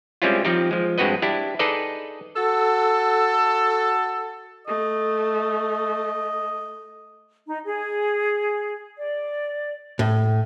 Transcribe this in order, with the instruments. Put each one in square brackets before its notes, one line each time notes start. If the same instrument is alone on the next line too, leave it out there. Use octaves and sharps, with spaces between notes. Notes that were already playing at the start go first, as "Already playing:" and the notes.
[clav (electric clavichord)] G3 G#3 C4 C#4 E4 F4
F3 C4 D#4 G4
F3 G#3
G2 G#3 C4 F#4 B4 D#5
D4 E4 G4
D#4 G#4 A4 B4 D5 D#5
[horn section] F#4 A4
[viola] A3 [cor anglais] D#5
[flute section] D#4
G#4
D5
[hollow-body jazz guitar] A2